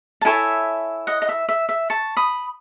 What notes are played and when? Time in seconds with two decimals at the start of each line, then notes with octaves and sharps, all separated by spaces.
0.21 A5
0.25 E4 A4 C#5 E5 G#5
1.07 D#5 F#5
1.22 D#5
1.29 E5
1.49 E5
1.69 E5
1.90 A5 C#6
2.17 B5 D#6